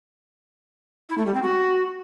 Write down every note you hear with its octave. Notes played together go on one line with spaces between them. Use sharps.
E4
A3
G3
C4
F#4